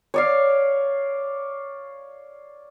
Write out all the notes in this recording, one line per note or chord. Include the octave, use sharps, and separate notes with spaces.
C#5 D5 F5